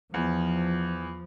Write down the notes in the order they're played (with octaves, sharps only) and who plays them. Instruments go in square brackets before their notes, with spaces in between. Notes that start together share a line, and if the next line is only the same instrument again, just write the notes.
[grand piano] E2 [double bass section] F3